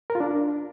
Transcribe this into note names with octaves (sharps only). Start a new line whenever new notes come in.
A#4
F4
D4